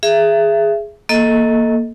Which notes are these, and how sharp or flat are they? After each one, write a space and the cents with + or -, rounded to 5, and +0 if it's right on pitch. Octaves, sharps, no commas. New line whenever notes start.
G#4 +0 E5 +25
A#3 +0 A4 +0 D#5 +20